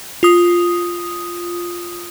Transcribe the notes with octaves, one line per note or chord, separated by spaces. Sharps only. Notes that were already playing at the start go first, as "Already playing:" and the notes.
F4 D#6